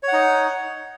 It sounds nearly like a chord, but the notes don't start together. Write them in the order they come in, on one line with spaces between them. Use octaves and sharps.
C#5 F#5 D#4